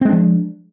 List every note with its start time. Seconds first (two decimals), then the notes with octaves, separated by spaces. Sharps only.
0.01 C4
0.05 G#3
0.09 D4
0.13 F3